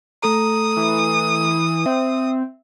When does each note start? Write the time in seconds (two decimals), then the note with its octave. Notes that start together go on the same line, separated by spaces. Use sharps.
0.22 A3 A4 A#5 D#6
0.76 E3
1.86 C4 E5